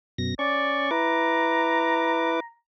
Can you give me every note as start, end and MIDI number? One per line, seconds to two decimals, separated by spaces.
0.18 0.34 42
0.18 0.34 47
0.18 0.34 94
0.39 0.91 61
0.39 0.87 74
0.39 0.91 85
0.91 2.40 64
0.91 2.40 71
0.91 2.53 82
0.91 2.40 86